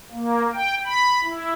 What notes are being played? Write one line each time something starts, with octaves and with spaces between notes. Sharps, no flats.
A#3
G5
B5
E4